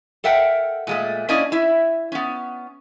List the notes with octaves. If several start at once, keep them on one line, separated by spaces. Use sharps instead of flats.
A4 A#4 E5 F#5 G5
A#2 G#3 A3
A#3 C#4 D4 E4 D5 D#5
E4 E5
B3 C#4